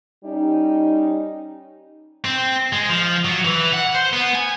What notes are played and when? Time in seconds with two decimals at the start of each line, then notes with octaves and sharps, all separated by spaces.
0.24 G3 C#4 D#4
2.25 C4
2.73 G#3
2.89 F3
3.25 F#3
3.44 E3
3.73 F#5
3.95 C5
4.13 B3
4.35 G#5